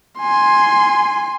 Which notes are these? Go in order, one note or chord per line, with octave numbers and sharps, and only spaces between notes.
G#5 C6